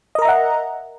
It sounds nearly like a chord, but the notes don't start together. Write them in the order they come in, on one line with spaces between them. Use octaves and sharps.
D#5 A#4 A#5 E5 F#5